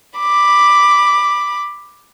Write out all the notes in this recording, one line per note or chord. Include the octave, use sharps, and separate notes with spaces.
B5 D6